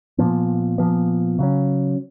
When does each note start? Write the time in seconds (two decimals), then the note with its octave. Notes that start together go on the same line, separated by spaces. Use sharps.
0.18 A#2 F3 B3
0.78 A#2 F3 B3
1.39 C#3 F#3 C#4